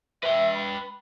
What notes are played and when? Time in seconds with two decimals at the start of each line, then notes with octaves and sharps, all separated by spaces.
0.23 B4 E5 G5
0.54 B5